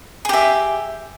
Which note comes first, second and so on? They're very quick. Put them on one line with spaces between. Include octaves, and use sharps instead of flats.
G#4 G4 E5